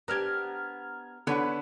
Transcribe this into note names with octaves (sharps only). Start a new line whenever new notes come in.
B3 D4 G4 A#5 F6 G#6
D3 B3 B4 C#5 F#6